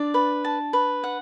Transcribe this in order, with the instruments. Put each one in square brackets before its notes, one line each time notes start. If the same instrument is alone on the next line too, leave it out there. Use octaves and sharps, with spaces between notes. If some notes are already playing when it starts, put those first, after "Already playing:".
Already playing: [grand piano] D4 [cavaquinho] D5
[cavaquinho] B4
A5
B4
F#5